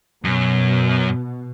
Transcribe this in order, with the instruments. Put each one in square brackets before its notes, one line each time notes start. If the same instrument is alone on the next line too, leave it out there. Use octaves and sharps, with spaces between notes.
[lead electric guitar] F#2 [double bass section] B2